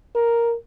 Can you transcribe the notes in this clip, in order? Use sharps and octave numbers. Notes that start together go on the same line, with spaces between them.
A#4